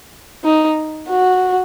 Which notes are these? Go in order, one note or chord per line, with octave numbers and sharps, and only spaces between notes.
D#4
F#4